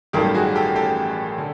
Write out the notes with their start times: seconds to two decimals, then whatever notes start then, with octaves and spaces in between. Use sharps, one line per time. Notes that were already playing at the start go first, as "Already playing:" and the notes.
0.13 A1 G2 D#3 F#3 A#3 G4 A4
0.34 F#4 G#4
0.55 G4 A4
0.76 G4 A4
1.38 D3